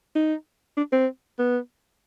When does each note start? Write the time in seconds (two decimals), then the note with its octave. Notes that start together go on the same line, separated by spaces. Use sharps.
0.15 D#4
0.77 D4
0.92 C4
1.39 B3